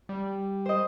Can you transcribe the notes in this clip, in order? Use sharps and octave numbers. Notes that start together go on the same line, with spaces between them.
G3
C5 D#5